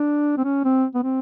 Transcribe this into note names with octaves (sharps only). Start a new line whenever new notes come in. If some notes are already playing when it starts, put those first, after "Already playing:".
Already playing: D4
C4
C#4
C4
B3
C4